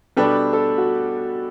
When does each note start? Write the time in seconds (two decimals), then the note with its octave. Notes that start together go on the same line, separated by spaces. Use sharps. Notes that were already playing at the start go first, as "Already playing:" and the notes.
0.17 B2 G3 D4 G4 A4 B4
0.53 A4
0.78 F#4